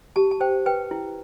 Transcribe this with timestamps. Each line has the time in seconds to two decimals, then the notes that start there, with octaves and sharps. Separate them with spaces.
0.16 G4 A5
0.31 A5
0.41 C5 G5
0.66 B4 G5
0.91 E4